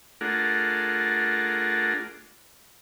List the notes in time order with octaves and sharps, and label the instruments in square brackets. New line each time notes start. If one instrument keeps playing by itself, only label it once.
[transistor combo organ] A3 D4 F4 G#4 A#4 F#5